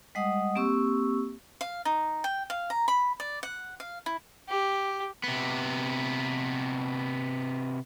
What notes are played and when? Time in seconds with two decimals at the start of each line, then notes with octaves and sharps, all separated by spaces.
0.15 G3 G#3 D#5 F#5 D#6
0.55 A#3 C4 G4 C#6 E6
1.61 F5
1.85 D#4
2.24 G5
2.50 F5
2.70 A#5
2.88 B5
3.20 D5
3.43 F#5
3.80 F5
4.06 E4
4.49 G4
5.24 C3 B3